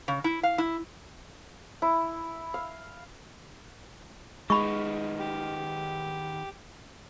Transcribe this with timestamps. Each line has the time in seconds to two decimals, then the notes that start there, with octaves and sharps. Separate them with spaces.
0.08 C#3
0.24 E4
0.43 F5
0.58 E4
1.82 E4
2.54 F5
4.50 D#3 G#3 B3 B5 C#6
5.19 G4